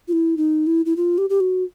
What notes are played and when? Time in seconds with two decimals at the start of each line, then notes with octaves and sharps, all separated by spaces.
0.08 F4
0.13 E4
0.37 D#4
0.67 E4
0.86 E4
0.97 F4
1.18 G4
1.30 G4
1.40 F#4